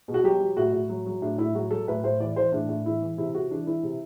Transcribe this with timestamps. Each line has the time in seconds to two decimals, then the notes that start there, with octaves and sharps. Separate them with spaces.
0.08 B2
0.14 F#4
0.24 F#3 G4
0.41 F#3
0.57 A2 F#4
0.73 A2
0.89 F#3
1.06 F#3
1.22 A2 D4
1.38 A2 E4
1.54 F#3 F#4
1.71 F#3 A4
1.88 A2 B4
2.04 A2 C5
2.20 E3 D5
2.36 E3 C5
2.52 A2 D4
2.69 A2
2.85 E3 E4
3.02 E3
3.17 C3 E4
3.34 C3 F#4
3.51 E3 D4
3.67 E3 E4
3.83 C3